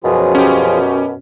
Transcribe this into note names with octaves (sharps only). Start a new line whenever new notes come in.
F#2 B2 F3 F4 G#4
C#4 G4